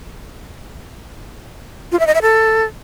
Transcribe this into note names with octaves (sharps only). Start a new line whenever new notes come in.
F4
E5
D#5
E5
A4